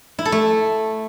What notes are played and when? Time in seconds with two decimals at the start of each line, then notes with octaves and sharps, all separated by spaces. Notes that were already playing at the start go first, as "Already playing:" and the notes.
0.19 E4
0.25 A4
0.32 A3